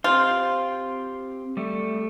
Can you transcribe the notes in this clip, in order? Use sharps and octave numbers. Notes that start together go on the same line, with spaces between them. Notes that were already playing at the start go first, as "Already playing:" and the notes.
C4 F4 G4 C5
G3 A3